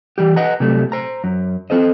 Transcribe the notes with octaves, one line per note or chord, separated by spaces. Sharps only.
E3 G3 G4
B4 D#5 F#5 A#5
C3 F#3 G3 A3
C5 A#5
F#2
C4 A4 C5 D#5